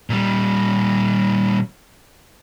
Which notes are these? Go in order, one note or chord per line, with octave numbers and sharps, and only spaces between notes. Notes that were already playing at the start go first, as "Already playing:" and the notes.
A#2 G3